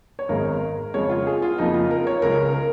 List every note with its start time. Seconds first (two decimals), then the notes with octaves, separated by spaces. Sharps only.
0.19 C#5
0.29 G#1 G#2 G#3 A#4
0.94 F2 C#3 G#3 C#5
1.10 F4
1.27 G#4
1.42 F4
1.58 F2 C#3 F3 A#3 D#4
1.74 F4
1.91 A#4
2.07 C#5
2.22 C#2 C#3 G#3 A#4
2.54 A#4